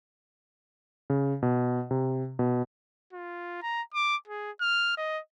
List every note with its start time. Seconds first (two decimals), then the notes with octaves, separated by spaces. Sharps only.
1.10 C#3
1.43 B2
1.91 C3
2.39 B2
3.13 F4
3.63 A#5
3.94 D6
4.28 G#4
4.61 F6
4.97 D#5